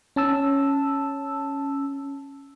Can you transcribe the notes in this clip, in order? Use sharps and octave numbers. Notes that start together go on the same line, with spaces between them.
C#4 A5 E6